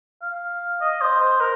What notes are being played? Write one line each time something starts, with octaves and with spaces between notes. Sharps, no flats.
F5
D#5
C5
C5
A#4